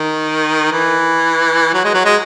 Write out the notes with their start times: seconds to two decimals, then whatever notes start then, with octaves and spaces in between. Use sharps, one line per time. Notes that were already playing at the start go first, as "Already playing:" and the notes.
Already playing: D#3
0.72 E3
1.74 F#3
1.84 G#3
1.94 F#3
2.05 G#3